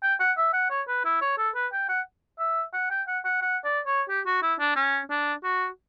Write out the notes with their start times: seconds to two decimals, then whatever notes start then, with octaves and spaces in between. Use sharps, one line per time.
0.03 G5
0.20 F#5
0.37 E5
0.53 F#5
0.70 C#5
0.88 B4
1.05 E4
1.21 C#5
1.38 A4
1.55 B4
1.72 G5
1.89 F#5
2.39 E5
2.73 F#5
2.90 G5
3.07 F#5
3.25 F#5
3.42 F#5
3.64 D5
3.86 C#5
4.09 G4
4.26 F#4
4.42 E4
4.59 D4
4.76 C#4
5.10 D4
5.43 F#4